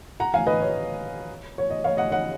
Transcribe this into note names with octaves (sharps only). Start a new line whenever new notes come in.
F#5 A#5
F5 G#5
B4 D#5
C#5
C#5
D#5
C#5 F5
D#5 F#5
D#5 F#5